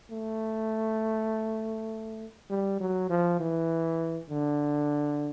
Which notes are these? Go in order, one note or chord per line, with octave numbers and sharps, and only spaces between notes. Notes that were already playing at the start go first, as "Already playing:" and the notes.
A3
G3
F#3
F3
E3
D3